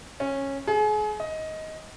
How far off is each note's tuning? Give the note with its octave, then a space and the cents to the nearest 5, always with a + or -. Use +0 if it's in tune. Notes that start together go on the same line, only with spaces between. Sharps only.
C#4 -15
G#4 +35
D#5 +15